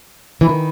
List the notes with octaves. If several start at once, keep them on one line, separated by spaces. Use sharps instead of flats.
E3
D#3